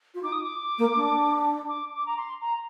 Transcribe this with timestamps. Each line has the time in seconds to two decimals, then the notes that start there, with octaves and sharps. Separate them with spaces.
0.15 F4
0.23 D#4 D6
0.32 D#6
0.43 D6
0.78 A#3
0.96 D4
1.68 D6
1.94 D6
2.07 A#5
2.17 C6
2.41 A#5